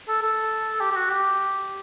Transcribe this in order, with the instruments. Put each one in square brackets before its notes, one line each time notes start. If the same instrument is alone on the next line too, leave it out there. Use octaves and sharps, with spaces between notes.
[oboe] A4
A4
G4
G4
F#4
G4